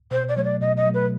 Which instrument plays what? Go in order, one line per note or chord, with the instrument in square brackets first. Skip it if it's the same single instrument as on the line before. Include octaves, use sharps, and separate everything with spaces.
[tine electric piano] B2 [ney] C5
[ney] D5
[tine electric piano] F#3 A3 [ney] C#5
[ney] D5
[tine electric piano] B2 [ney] D#5
[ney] D#5
[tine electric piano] F#3 A3
[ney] B4